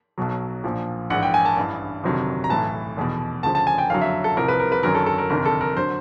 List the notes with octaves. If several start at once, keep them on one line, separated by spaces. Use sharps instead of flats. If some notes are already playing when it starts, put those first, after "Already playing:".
B1 B2 F#3
A#1 A#2 F3
A#1 G#2 E3 F#5
G5
G#5
A5
A1 G2 E3
G1 F2 C3 D#3 F#3
A#5
B1 A2 E3 A5
F1 E2 B2
D2 C#3 F3 A5
A5
G#5
G5
F#1 F2 D3 F#3 F5
E5
A4
C2 C3 F3 A#4
B4
A#4
B4
G1 F#2 D#3 F#3 A#4
A4
A4
A#4
G1 F2 C3 D#3 A#4
A4
A#4
D3 F#3 C5